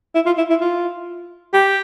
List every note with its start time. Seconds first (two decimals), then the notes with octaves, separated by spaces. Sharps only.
0.15 E4
0.26 F4
0.38 E4
0.50 E4
0.60 F4
1.53 G4